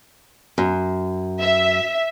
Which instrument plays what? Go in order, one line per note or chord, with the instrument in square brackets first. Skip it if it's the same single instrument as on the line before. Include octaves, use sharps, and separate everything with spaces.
[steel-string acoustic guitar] F#2
[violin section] E5